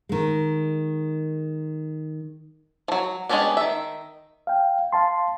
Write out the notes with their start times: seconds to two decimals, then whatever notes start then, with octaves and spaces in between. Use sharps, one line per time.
0.09 D#3 G#3
2.88 F3 F#3
3.29 G#3 B3 C#4 D4 G4
3.57 D#3 E5
4.47 F5 G5
4.93 F5 A5 C6